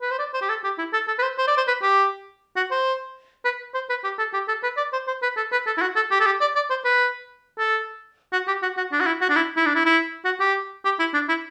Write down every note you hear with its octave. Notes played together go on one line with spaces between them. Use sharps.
B4
C5
D5
C5
G4
A4
G4
E4
A4
A4
B4
C5
C5
D5
C5
B4
G4
F#4
C5
B4
C5
B4
G4
A4
G4
A4
B4
D5
C5
C5
B4
A4
B4
A4
E4
F#4
A4
G4
A4
G4
D5
D5
C5
B4
A4
F#4
G4
F#4
F#4
D4
F#4
E4
F#4
D4
E4
E4
D4
E4
E4
F#4
G4
G4
E4
D4
E4